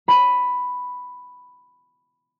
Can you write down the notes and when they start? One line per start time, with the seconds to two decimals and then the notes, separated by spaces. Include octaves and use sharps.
0.08 B5 D#7